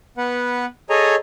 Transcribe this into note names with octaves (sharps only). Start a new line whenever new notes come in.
B3 B4 F#5
G#4 A4 C#5 D#5 G#5 A#5